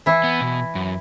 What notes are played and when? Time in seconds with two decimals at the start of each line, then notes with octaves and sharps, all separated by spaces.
0.06 E3 E4
0.24 B3
0.41 B2
0.75 F#2